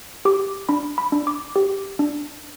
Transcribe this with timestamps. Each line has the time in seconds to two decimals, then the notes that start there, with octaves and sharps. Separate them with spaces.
0.25 G4 D6
0.69 D4 B5
0.98 B5
1.12 D4
1.27 D6
1.56 G4
1.99 D4